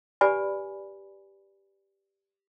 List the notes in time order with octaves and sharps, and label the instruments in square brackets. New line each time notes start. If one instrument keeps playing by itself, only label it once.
[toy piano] G4 B4 D5 G#5 B5